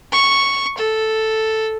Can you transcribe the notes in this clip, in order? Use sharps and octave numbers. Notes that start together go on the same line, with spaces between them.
C#6
A4